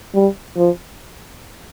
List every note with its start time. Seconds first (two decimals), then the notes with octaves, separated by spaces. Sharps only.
0.14 G3
0.56 F3